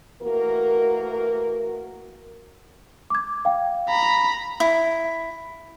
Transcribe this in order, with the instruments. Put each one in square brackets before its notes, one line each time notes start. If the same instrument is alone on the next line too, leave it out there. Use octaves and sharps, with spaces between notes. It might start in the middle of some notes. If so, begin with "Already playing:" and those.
[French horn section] E3 A3 A#3 F#4 A#4
[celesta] D6 G#6
F5 G5
[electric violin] A#5 B5
[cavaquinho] E4